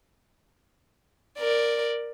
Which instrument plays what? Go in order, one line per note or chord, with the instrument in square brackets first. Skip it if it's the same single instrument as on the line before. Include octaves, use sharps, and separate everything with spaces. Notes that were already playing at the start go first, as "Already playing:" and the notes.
[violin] A#4 D5